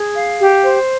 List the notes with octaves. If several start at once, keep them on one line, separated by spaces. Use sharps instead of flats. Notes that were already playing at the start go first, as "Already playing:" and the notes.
Already playing: G#4
F5
G4
C5